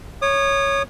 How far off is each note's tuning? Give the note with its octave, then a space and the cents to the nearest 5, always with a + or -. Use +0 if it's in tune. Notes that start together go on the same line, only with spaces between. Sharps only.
C#5 +0 D#6 -35